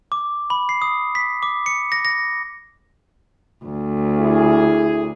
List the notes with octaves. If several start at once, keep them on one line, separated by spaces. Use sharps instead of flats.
D6
B5
C7
D#6
B6
D6
C#7
A#6
A#6
D2
E4 G#4